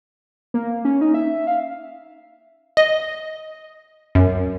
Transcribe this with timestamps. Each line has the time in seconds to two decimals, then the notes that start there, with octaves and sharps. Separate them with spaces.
0.54 A#3
0.85 C#4
1.01 D#4
1.14 E5
1.47 F5
2.77 D#5
4.15 F#2